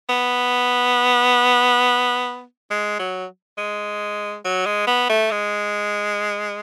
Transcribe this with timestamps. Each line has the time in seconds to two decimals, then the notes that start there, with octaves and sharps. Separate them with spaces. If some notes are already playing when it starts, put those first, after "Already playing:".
0.10 B3
2.71 G#3
2.99 F#3
3.58 G#3
4.45 F#3
4.66 G#3
4.88 B3
5.09 A3
5.31 G#3